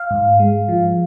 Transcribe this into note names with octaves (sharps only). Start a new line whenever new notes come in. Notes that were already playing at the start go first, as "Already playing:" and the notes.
Already playing: F5
G#2
G#3
F3